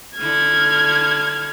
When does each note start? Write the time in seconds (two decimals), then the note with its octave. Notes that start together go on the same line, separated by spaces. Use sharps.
0.19 D3 E4 F6 G#6